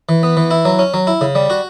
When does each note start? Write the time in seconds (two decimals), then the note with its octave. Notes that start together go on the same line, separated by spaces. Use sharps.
0.09 E3
0.23 B3
0.37 E3
0.51 E4
0.65 F#3
0.79 C#4
0.94 F#3
1.07 E4
1.21 C#3
1.35 G3
1.50 F#4